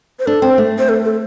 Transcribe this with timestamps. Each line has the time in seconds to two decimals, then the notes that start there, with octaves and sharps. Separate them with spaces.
0.19 C5
0.26 D4 A4
0.42 C4
0.58 A3
0.79 C5
0.89 A4
1.04 A4